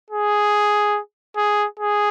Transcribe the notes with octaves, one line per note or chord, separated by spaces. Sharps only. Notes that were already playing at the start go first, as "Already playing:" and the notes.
G#4
G#4
G#4